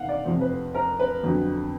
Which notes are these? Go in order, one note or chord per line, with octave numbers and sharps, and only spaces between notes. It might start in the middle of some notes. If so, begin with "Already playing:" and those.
Already playing: E1 D#3 F5 F#5
D5
F1 F2 C3 F3 C5
B4
A#4
B4
G1 F2 D3 F#3